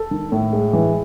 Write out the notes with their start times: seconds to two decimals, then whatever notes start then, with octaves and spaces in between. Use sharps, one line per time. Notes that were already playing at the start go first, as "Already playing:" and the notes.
Already playing: A4
0.11 D#3
0.32 A2
0.53 G#3
0.73 E3